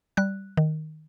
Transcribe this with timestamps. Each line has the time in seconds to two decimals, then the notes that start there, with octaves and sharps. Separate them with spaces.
0.17 G3 F#6
0.57 D#3